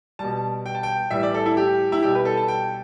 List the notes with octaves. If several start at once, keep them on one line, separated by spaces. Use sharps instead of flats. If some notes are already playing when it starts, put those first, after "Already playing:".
B2 G3 A5
G5
A5
G5
A2 E3 G3 E5
D5
A4
E4
G4
E4
B2 G3 G4
B4
A4
A5
G5